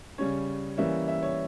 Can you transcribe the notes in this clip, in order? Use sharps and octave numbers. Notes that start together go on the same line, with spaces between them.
C#3 G3 C#4 C#5
E3 G3 A#3 C#4 E5
E5
C#5